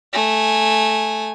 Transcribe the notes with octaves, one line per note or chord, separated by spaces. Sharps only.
A3 G#5